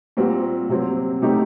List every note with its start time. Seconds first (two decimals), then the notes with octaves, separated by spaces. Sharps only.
0.17 A#2 G3 C4 F#4
0.69 C3 F#3 C4
1.22 C3 F#3 A3 D#4 G4